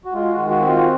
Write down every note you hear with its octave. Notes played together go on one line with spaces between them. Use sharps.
F#4
G#3 F4
F#4
D#3
F#4
C4
F4